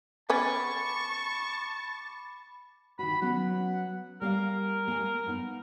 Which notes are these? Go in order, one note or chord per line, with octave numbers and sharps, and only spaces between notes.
B3 C#4 A5 B5 C#6 D6 A6
D#3 F#4 B5
F#3 B3 C#4 F#5
G3 A#3 A#4 F5
A#3 G#5
A#3 B3 D#4